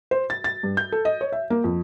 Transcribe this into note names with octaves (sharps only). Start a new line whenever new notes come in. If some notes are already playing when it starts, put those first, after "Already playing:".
C5
A6
A6
G2
G6
A4
D#5
C#5
E5
A#3
F2